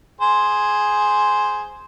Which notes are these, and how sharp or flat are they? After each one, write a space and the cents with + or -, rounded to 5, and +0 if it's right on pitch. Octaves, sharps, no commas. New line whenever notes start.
G#4 +0 C5 +0 G#5 +0